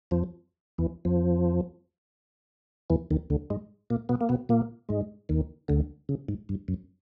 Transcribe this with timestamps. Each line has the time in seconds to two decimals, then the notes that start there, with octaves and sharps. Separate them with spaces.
0.11 F2 F3
0.78 E2 E3
1.05 F2 F3
2.90 E2 E3
3.11 D#2 D#3
3.30 D2 D3
3.50 G#2 G#3
3.90 A#2 A#3
4.09 B2 B3
4.21 A#3
4.29 B2 B3
4.49 A#2 A#3
4.89 G#2 G#3
5.29 D#2 D#3
5.68 D2 D3
6.09 C#3
6.28 G#2
6.49 G2
6.68 F#2